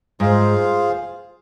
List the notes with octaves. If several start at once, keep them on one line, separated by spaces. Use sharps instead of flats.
G#2 F4 G#4 C5 F5